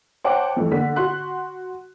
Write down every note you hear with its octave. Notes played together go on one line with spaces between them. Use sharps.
C5 C#5 F#5 G5 A5 D6
F2 E3 A3
D3 A#3 B6
F#4 C6 F#6